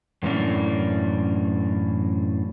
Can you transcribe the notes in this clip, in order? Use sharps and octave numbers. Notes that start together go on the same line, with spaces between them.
F#2 A2 E3 A#3 C#4 D4